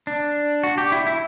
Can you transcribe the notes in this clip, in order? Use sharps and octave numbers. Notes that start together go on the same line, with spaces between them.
D4
F#4
G4
E4
E4